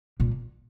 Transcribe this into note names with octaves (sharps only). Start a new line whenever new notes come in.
A#2